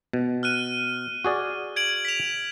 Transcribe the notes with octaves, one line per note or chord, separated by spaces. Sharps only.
B2
F6 F#6 D#7
F#4 G#4 D5
G#6 D7 F#7
B6 F7